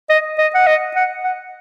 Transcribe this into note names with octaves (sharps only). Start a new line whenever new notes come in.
D#5
D#5
F#5
D#5
F#5
F#5